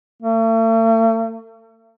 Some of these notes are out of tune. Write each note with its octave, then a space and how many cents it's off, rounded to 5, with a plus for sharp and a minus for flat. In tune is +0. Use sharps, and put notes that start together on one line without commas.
A3 +45